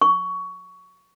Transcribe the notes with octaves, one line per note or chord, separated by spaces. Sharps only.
C#6